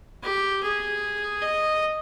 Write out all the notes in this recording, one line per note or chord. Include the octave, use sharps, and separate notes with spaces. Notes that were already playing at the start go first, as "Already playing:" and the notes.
G4
G#4
D#5